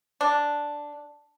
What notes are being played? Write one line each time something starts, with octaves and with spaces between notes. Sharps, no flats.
D4